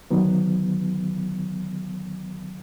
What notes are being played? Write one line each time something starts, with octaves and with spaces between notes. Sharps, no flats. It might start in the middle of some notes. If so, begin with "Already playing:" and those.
D3 D#3 F#3 B3